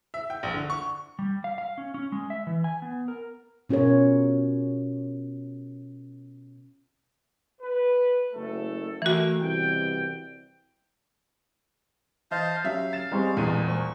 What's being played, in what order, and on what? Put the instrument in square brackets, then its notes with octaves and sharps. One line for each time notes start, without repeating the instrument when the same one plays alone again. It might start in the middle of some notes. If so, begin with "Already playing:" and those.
[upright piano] E5
G5
A#1
D3
C#6
[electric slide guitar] G3
F5
F5
C#4
C#4
G#3
E5
E3
G#5
B3
A#4
[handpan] B2 C#4 F4 A#4 C#5
[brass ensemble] B4
F#1 A3 A4
[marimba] E3 F#4 [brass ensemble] A3 A#3
[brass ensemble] C2 B2 G5
[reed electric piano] E3 [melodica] C5 F5 A5 [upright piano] D#5
[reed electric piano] F#3 C#4 G4 [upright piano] E5 [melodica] F5
[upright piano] A6 E7
[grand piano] G3 G#3 C4 [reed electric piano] A#5 C6 C#6
[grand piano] D#1 D#7 [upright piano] E2 [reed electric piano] G#3
[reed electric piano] C5 [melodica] C#6